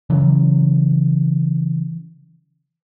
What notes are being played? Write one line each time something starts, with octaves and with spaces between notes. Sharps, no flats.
C#3 E3 F#3